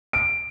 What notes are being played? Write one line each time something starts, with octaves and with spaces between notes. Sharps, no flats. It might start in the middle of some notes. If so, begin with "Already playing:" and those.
D7